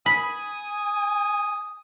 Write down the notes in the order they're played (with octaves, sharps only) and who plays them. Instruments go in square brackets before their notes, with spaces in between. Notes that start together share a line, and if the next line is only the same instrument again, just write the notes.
[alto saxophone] G#5 [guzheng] B5 [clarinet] D#6